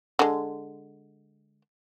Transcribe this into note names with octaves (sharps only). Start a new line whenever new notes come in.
D3 G#3